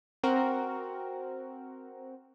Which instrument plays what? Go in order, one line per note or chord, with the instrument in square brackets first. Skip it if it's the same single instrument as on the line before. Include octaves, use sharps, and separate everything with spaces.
[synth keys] C4 F#4 A#4